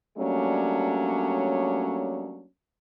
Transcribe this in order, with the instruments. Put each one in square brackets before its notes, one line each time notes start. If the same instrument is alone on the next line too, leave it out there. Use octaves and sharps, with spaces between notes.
[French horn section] F#3 G3 A3 A#3 C#4 D4